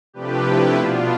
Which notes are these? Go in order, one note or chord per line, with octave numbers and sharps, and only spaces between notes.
C3 F3 A3 D4 G4 B4
E4 G4
B2 B3 D4 F4